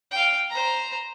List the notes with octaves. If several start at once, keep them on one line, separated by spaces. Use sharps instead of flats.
F5 G5
C5 A#5